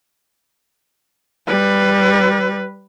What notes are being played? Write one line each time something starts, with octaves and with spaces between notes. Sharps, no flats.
G3 B4